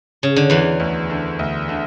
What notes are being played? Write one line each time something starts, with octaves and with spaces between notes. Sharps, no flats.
C#3
D3
E2 E3 D4
D2
D3
D2
D3